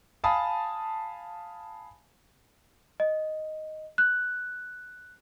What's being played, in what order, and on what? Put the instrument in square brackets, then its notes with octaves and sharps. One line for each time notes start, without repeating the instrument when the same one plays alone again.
[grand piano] F5 G#5 A5 B5 D#6
[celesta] D#5
F#6